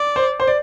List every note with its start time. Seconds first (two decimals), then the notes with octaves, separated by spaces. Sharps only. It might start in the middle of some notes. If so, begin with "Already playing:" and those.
Already playing: D5
0.16 C5
0.40 C5
0.47 D5